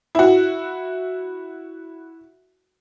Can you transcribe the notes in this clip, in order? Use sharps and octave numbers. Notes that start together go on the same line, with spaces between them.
E4 F#4